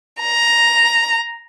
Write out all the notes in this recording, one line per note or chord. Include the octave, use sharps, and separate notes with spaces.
A#5